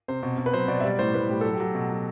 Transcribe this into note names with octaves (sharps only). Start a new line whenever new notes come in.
C3 C5
B2
B2
B4
F#3 C5
B2 D5
E5
G3 D5
A2 C5
A2 B4
A2 G4
F#3 A4
G4
F#3
B2
F#3